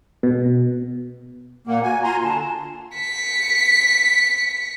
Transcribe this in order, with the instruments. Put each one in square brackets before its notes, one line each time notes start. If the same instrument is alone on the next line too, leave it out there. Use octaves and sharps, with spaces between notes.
[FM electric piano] B2
[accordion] A#2 A#3 [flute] F#5
[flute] F#4 [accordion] G#5
[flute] F4 [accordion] G#5 A#5 C6
[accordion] D3 [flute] A5
[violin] B6 C#7